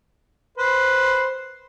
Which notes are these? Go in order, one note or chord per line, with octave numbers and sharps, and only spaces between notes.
B4 C5